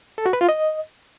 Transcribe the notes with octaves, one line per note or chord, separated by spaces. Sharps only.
A4
F#4
B4
F4
D#5